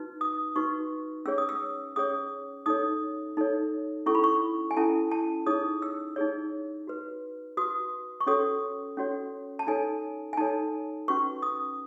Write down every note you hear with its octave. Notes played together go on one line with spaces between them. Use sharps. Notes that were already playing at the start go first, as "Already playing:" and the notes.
Already playing: D#4 F#4 B4
D#6
D#4 F#4 B4 C#6
C#4 G#4 C#5 E6
D#6
E6
C#4 G#4 C#5 D#6
D#4 A4 C#5 D#6
D#4 A4 C#5
C#4 E4 A4 C#6
B5
C#6
G#5
C#4 E4 A4 A5
A5
D#4 G#4 C#5 D#6
E6
D#4 G#4 C#5
F#4 B4
F#4 B4 D#6
C#6
C#4 F#4 A4 C#5 D#6
C#4 F#4 A4 C#5
A5
D#4 A4 C#5 G#5
G#5
D#4 A4 C#5 A5
C#4 F#4 B4 C#6
D#6